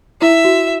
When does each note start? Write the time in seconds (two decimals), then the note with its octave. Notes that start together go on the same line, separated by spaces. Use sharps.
0.21 E4 E5
0.45 F#4